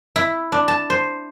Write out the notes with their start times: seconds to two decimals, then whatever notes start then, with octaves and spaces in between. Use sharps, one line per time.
0.16 E4
0.52 D4
0.68 A5
0.90 C5